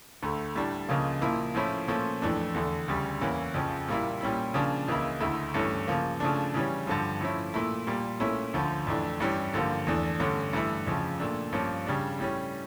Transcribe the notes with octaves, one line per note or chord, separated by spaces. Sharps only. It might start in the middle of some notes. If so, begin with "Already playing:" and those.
D2 D3 A3
A2 G3 D4
C#2 C#3 F3 A#3
A#2 F3 A#3 E4
A2 F3 C#4 E4
A#2 F3 A3 C#4
F2 E3 A3 D4
E2 D3 A3
D2 C#3 G3
E2 E3 A#3 C#4 E4
F2 C#3 F3
A#2 G3 A#3 E4
A#2 G3 C#4 E4
C#3 F3 A#3 D4
C#2 C#3 E3 A#3 E4
D2 D3 A3 E4
G2 E3 A3 C#4
C#3 F3 A#3
C#3 F3 A3 D4
C#3 E3 G3 C#4
G2 D3 F3
A2 F3 C#4 E4
A#2 A3 E4
A#2 G3 A#3
A#2 A3 C#4 E4
D2 D3 F3
F2 E3 A3 D4
G2 E3 G3 C#4
G2 D3 F3 A#3
E2 E3 A3 D4
G2 D3 A3 C#4
G2 E3 A3 E4
F2 C#3 F3
A#2 A3 D4
G2 F3 A#3 C#4
C#3 G3 D4
A2 G3 C#4